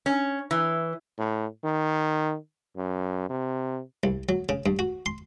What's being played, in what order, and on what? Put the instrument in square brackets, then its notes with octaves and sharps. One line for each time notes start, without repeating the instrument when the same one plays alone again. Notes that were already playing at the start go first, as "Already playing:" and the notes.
[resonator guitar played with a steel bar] C#4
E3
[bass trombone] A2
D#3
F#2
C3
[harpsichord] C2
F#3
C#3
G2
F#4
C6